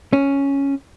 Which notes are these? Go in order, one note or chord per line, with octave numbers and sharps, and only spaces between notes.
C#4